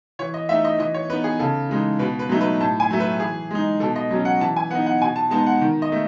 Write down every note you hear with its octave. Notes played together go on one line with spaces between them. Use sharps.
E3 C#5
D#5
A3 D#4 E5
D#5
E3 D#5
C#5
B3 D#4 B4
G#4
C#3 A4
E3 G#3 D#4
B2 B4
B4
F#3 A3 D#4
B4
A2 A5
G#5
F#3 A3
B4
E3 G#4
G#3 D#4
B2 A4
D#5
F#3 C#4
F#5
E3 A5
G#5
B3 D#4 F#5
F#5
B2 G#5
A5
G#3 B3 D#4 A5
F#5
D#3
D#5
A3